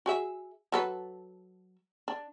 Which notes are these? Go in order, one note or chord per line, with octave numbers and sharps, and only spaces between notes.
F#4 G#4 E5
F#3 A4 B4
D4